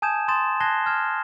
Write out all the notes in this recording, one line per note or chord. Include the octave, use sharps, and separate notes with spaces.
G#5 A5 D#6 G6 G#6 E7
C6 D#6 G6 A6 E7
A5 F#6 G#6 A#6 C7 G7
F6 G#6 E7